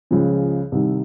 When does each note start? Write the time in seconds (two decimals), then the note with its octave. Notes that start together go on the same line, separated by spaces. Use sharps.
0.11 C#2 C#3 F3 G#3
0.72 C2 C3 D#3